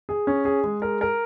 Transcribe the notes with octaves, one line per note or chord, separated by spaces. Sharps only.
G#4
C#4
G#4
G#3
A#4
A#4